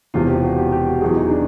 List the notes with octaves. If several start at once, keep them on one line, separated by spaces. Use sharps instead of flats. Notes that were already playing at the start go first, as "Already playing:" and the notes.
E1 E2 C3 F3 F4
G4
F#4
G4
G4
F#4
E2 B2 F#3 G#4
D#4
D4